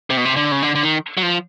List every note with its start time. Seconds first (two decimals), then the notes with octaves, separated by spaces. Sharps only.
0.10 C3
0.17 B2
0.25 C3
0.36 D3
0.52 C#3
0.63 D3
0.75 D3
0.83 D#3
1.17 F#3
1.23 F3